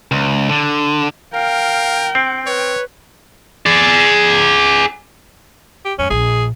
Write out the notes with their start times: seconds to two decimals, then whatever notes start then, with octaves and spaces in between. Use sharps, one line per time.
0.12 C#2
0.49 D3
1.33 A#4 F5 G5
2.15 C4
2.46 B4 C#5
3.66 G#4 D5
5.85 G4
5.99 F2 G#2 C#4
6.10 A#1 G#4